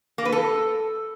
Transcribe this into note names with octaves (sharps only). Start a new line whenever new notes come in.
A#3
B4
A4